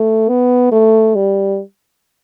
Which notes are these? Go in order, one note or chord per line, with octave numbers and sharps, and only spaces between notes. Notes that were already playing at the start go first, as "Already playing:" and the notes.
Already playing: A3
B3
A3
G3